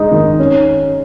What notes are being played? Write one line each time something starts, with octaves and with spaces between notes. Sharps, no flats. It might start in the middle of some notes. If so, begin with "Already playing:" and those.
Already playing: G#3 D#4
D#3
C#4